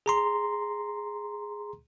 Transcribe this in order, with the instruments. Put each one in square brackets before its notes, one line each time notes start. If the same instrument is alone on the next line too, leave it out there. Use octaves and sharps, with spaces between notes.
[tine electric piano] G#4 A#5 C6